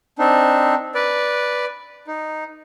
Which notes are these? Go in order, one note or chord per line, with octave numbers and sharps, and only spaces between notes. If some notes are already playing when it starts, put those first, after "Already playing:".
C4 D4 D#4
B4 D5
D#4